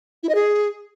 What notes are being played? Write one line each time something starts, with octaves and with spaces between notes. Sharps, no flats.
E4
D#5
G#4